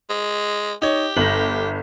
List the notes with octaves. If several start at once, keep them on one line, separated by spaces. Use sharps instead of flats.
G#3
D#4 G4 C#5
G1 A#6 F#7